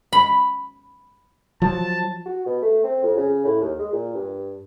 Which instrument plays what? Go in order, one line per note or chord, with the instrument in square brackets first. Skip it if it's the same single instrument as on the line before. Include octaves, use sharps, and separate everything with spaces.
[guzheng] B5
[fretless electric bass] F3 F#3 [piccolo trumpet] A5
[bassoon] F#4
B2
A3
C4
F2
C#3
A2
D#2
G#3
A#2
G2